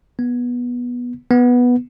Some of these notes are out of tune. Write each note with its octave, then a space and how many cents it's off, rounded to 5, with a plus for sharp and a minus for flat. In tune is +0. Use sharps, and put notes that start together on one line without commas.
B3 -15
B3 -5